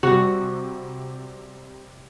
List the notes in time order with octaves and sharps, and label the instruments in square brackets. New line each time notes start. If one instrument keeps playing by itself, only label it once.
[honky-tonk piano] C3 G3 [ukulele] F#4